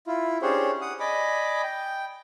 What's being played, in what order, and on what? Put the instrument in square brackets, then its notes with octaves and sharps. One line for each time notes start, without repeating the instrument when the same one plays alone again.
[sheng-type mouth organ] E4 F4
C#4 D4 G4 G#4 C5 C#5
F#5 D#6
D5 D#5 G#5 B5 D6
G5